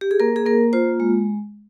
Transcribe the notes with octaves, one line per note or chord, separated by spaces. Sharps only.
G4
G#4
A#3 A#4
G#4
A#3 A#4
F4 C5
G#3